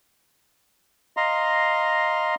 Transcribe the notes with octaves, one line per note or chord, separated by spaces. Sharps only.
D#5 F5 A#5 C6